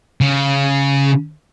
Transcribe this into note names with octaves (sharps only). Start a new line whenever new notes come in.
C#3